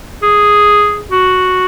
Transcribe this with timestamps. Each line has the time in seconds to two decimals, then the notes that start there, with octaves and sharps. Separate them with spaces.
0.23 G#4
1.11 F#4